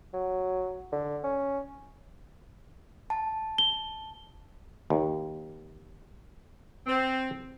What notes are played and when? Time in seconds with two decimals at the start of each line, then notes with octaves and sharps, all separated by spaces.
0.14 F#3
0.92 D3
1.24 C#4
3.10 A5
3.58 G7
4.90 D#2
6.87 C4